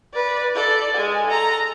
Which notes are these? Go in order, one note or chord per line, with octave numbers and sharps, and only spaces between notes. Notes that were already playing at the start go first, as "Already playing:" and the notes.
B4 D5
A4 D5
G#3 G#5
A4 A#5